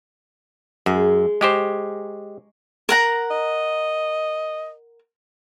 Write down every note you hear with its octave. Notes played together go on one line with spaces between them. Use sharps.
F#2 G#3
G#3 G4 C5 C#5 G#5 A#5
A#4 F#5 A#5
D#5